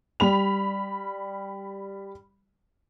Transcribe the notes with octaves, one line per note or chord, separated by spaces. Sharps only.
G3 B5 F7